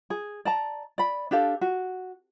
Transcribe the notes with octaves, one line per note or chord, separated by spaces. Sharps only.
G#4
D5 A5 A#5
D5 B5
D4 G4 A4 F5
F#4